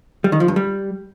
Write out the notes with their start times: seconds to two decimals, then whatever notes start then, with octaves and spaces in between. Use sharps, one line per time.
0.24 G3
0.32 D#3
0.40 F3
0.48 G2
0.56 G3